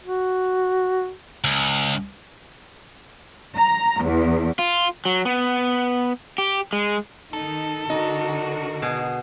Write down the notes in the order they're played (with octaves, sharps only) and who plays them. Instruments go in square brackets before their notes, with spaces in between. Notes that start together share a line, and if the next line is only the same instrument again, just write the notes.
[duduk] F#4
[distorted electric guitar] C#2
[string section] A#5
E2
[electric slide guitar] F4
F#3
B3
G4
G#3
[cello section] D#3 D#4 [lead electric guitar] A4
[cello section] D3 F#4 A#4 [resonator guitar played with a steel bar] D#4
[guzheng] B2 G#4